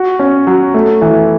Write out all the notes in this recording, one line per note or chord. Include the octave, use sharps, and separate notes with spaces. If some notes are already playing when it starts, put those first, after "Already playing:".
Already playing: F#4
C#4
F#3
A3
E3